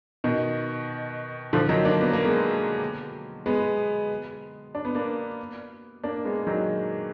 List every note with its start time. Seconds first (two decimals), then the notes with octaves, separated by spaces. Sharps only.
0.24 B2 D#3
1.53 D3 F3
1.69 D#3 F#3
1.85 A#3 D4
2.01 B3
2.13 A#3
2.25 G#3 B3
3.46 G#3 B3
4.75 D4
4.85 B3
4.95 A#3 D4
6.03 A#3 D4
6.25 G#3 B3
6.47 D#3 F#3